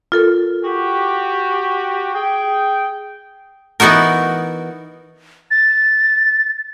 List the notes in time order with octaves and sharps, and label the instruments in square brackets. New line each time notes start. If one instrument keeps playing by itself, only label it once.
[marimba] F4 A4 A#4
[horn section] F#4 G4
G#4 G5
[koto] E3 B3 D#4 F#4 A#4
[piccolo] A6